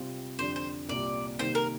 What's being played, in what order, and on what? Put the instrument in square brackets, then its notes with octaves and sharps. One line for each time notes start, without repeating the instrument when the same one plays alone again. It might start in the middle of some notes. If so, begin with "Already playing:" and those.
Already playing: [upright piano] C3 G3 C4 F4
[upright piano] F2 D3 G3 D4 [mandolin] C5
[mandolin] C5
[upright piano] C2 A#2 G3 [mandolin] D5
[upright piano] C3 D#3 G3 A#3 [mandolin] C5
[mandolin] A#4